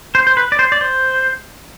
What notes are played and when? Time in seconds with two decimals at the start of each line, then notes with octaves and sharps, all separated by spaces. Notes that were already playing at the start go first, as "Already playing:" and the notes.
0.15 C5
0.27 C5
0.37 B4
0.52 D5
0.59 C5
0.72 D5
0.81 C5